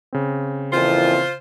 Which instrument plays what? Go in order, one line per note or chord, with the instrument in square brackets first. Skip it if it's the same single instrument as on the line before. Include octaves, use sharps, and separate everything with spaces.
[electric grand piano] C#3 C4
[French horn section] F2 A#2 E3 [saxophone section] F4 C5